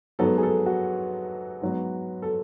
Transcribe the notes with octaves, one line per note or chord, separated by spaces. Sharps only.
G#2 F#3 B3 A4
G#4
A4
F#4
G#2 F#3 B3
A4